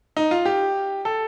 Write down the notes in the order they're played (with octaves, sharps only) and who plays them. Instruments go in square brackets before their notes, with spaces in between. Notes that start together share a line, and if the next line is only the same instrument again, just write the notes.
[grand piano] D#4
F4
G4
A4